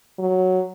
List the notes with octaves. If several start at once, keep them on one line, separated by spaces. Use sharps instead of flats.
F#3